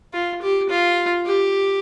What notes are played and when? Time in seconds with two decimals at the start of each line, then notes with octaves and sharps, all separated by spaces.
0.13 F4
0.42 G4
0.69 F4
1.26 G4